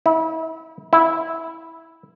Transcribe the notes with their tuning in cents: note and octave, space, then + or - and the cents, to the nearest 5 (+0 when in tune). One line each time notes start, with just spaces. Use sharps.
E4 -35
E4 -10